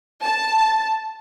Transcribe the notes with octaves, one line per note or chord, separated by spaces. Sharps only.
A5